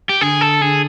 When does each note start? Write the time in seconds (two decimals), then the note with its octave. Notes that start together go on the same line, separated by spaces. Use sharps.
0.09 G4
0.21 D3 G#4
0.41 A4
0.61 D3 G#4